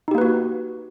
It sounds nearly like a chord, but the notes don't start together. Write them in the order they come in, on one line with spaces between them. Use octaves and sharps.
D#4 G4 A#3 B4 F#4